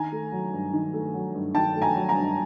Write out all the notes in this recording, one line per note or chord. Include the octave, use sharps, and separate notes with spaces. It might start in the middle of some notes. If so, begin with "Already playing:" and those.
Already playing: D#3 G#5 A#5
A3
F#3
G2
D#3
A3
F#3
G2
D#3 G5 A5
A3
G#5 A#5
F#3
G#5 A#5
G2